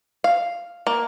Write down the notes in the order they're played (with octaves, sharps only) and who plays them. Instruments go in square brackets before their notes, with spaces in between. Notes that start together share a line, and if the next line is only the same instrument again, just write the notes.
[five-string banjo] F5
A#3